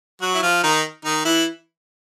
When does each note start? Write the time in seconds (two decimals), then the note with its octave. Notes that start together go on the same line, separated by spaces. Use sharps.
0.21 F#3 F#4
0.35 E4
0.42 F3 F4
0.64 D#3 D#4
1.05 D#3 D#4
1.25 E3 E4